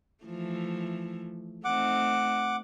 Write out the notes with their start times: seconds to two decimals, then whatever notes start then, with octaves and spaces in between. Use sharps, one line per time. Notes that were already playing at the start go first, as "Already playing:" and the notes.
0.25 E3 F3 A3
1.65 A3 C4 D#4 F#5 D6